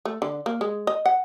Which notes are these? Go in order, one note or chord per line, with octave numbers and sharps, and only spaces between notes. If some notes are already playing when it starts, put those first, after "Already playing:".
A3
D3
A#3
G#3
D#5
F#5